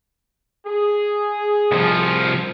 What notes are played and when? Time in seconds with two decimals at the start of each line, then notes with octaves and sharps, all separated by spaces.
0.66 G#4
1.72 C2 F3